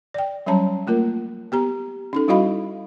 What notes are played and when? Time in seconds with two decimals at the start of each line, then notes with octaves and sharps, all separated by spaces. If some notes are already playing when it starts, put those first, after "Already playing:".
0.14 D5 G5
0.46 F#3 G3 C#4 C#5 A5 A#5
0.87 A3 A#3 F4 A#4
1.52 B3 G4 A#5
2.13 C#4 D#4 A4
2.28 G3 E4 F#4 D#5 F5 B5